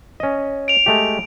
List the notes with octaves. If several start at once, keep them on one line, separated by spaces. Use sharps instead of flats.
C#4 D#5
D7 F7
G#3 A3 G4